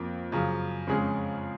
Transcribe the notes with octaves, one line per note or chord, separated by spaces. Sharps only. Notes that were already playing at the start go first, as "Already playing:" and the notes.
Already playing: F2 F3 A#3
F#2 C#3 F3
F2 C#3 G#3 C#4 G#4